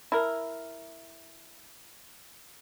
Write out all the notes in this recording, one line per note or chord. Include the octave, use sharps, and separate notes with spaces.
E4 A#4